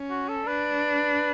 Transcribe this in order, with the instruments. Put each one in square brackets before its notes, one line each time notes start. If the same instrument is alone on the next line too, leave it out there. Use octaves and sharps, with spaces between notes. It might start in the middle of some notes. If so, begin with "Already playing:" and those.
Already playing: [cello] C#4
[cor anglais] F#4
A4
[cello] D4 [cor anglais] B4